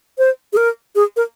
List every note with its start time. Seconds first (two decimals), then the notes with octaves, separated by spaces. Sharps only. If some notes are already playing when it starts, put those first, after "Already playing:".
0.18 C5
0.53 G#4
0.57 A#4
0.95 G#4
1.16 A#4